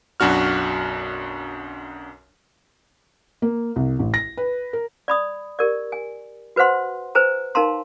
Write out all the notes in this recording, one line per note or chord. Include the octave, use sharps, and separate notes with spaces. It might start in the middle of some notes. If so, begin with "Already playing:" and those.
B1 F#2 D4 F#4 F6
A#3
C2
A1
A#6
B4
A#4
D5 B5 D#6
G4 A#4 D5
G#5
F#4 B4 C5 F#5 C6
B4 C5 G#5 A#5
D#4 A#4 F5 A5 A#5 C6